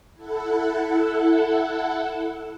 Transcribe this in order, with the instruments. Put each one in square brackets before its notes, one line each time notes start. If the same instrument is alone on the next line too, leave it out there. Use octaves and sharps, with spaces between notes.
[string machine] E4 A4 F#5